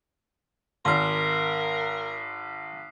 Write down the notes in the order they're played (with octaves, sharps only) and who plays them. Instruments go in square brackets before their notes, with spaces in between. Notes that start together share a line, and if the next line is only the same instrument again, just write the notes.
[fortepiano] G#1 [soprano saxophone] A#4 [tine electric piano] C6 F6 [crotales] D6 D#6 C7